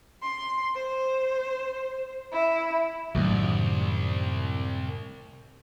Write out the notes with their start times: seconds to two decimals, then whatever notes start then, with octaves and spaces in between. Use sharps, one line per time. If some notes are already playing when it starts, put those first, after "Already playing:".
0.22 C6
0.75 C5
2.31 E4
3.15 C2 F#2 A2 D#3 F#3